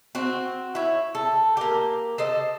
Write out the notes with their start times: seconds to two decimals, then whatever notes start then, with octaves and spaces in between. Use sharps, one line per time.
0.15 C4 F#4
0.75 E4 C#5
1.15 A4
1.57 A#3 G4
2.18 A4 C5 D#5